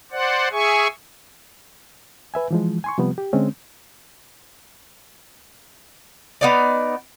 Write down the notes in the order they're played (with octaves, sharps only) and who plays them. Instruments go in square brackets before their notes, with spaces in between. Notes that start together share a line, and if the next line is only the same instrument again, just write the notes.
[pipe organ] C5 D5 F#5
G#4 E5 G#5 C#6
[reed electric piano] B4 E5 G#5
E3 F3 G#3
G#5 C6 C#6
C3 F3 G3 B3
G4
D3 G#3 C4 C#4
[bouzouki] B3 D#4 D5